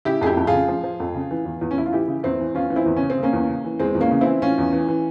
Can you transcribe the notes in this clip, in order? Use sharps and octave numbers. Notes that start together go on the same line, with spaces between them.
C#3 E4 G4
F2 G#4
E4 G4
F2
F4 G#4
C#3
F3
F3
F2
C#3
E3
E2
E2
C#4
E2 E4
F4
E3 E4 G4
C#3
E2 C4 E4
E3
E2 C#4 F4
E3
C4 E4
E2
C#4
C#3
C4
C#3
A#3 C#4
E2
C#3
E3
E2 G#3 C4
E2
A#3 C#4
C#3
E3 C4 E4
E3 C#4 F4
E2
E3
E3